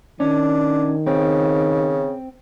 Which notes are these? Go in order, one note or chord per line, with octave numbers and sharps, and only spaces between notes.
D#3 C#4 D4
C#3 C4